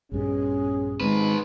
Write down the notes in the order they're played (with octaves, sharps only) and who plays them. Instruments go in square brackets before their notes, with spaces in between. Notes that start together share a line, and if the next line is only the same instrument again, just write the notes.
[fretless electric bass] A#1 G2 B2 [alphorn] C#4 [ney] G#4
[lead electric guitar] B1 B4 [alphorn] G#2 [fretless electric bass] D#3 G#3 C4